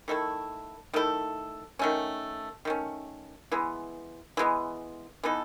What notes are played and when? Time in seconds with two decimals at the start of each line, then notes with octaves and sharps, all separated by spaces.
0.08 D#3 A3 E4 A4
0.93 D#3 A3 E4 A4
1.79 D#3 A3 C#4
2.65 D#3 A3 C#4
3.52 E3 G#3 B3
4.37 E3 G#3 B3
5.23 E3 B3 D#4 A4